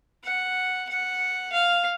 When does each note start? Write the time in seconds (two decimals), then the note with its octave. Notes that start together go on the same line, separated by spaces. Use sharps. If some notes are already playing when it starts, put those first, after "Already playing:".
0.24 F#5
0.89 F#5
1.52 F5